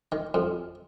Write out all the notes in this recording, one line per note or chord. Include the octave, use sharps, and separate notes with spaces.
D#3
F2